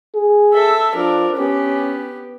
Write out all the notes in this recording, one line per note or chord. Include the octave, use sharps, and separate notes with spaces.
G#4
A4 E5
F3 D4 A#4
B3 C#4 G4